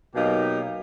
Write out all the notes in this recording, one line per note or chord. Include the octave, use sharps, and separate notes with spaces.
B2 F#3 A#3 D#4 G4